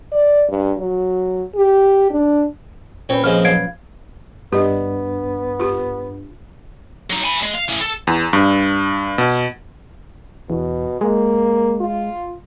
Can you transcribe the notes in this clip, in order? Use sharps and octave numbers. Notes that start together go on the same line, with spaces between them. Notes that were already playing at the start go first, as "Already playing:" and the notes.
D5
G2
F#3
G4
D4
A#2 C4 C#4 B4 C#5
F2 F3 G#3 F6
F#3 B4 F5 G#6 D7
G2 B3 D4 G4 D#5
F4 G4
F#3 D#4
G#5 B5
G#3
F5
E3 C#4
A4
E2
G2
B2
E2 B2
G#3 A#3
F4